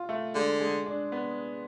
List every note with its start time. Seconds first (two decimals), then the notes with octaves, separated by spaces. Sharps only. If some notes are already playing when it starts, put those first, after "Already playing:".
Already playing: F4
0.09 A3
0.35 D3 G#3
0.60 G#3
0.86 D4
1.12 B3